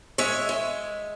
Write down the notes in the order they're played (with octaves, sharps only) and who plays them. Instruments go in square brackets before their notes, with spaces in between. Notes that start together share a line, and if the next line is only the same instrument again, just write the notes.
[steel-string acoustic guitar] G#3 C#5 E5
G#3